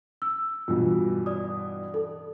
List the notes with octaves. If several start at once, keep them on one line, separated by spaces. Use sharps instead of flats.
E6
G2 B2 E3 F4
D5 D#6
A4